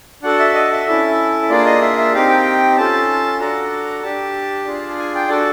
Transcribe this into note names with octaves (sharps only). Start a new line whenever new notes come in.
D4 F#4 A4 F#5
E5
D#5
E5
C#4 E4 A4
A#3 D4 F4 G#4 D5
D#5
E5
E5
C4 D#4 G4 F5
G5
C#4 F4 A4 A5
D4 F#4 A4 A#5
D4 G4 A5
D4 F4 G#4
G#5
G5
D4 F#4 A4 D5